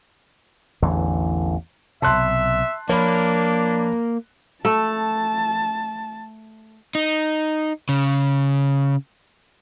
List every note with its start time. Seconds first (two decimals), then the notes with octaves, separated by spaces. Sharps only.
0.82 A1 E2 D3 E3
2.02 B1 C3 E5 A5 C6 F#6
2.89 F3 A#3 D4 C#5 B5
4.65 A3 A5
6.95 D#4
7.89 C#3